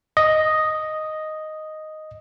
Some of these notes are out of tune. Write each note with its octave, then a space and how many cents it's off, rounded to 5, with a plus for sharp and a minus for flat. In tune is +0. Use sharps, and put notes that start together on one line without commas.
D#5 +0